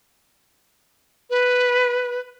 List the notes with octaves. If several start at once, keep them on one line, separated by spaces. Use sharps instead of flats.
B4